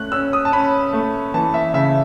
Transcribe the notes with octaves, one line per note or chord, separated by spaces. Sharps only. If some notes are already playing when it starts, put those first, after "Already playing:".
Already playing: A3 C#4 F#6
C#4 E6
D#6
A5
C#4 B5
A3
E3 A5
E5
C#3 E5